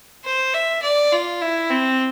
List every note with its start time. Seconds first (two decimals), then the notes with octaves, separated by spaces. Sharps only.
0.25 C5
0.54 E5
0.82 D5
1.12 F4
1.41 E4
1.70 C4